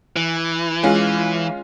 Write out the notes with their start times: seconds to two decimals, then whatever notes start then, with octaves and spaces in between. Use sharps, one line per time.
0.16 E3
0.83 G#3 C#4 F4